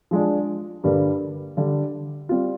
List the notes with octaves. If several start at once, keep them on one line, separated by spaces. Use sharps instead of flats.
F3 G#3 D4
G2 D3 G3 A#3
D3 G3 D4
G3 C4 F4